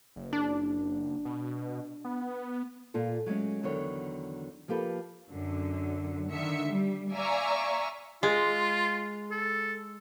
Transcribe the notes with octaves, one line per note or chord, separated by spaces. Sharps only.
F#1
D4
B2
B3
A#2 F4 A4
F#3 G#3 A3 C#4
E2 D3 D#3 F#3 C#5
F3 A#3 G4 A4 B4
F#2 D3
D3 D#3 E5 C#7
G3
D5 E5 F5 G#5 A#5 C#6
G#3 F4
A4